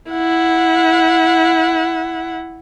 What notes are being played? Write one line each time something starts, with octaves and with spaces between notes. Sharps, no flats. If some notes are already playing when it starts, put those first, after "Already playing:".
E4 F#5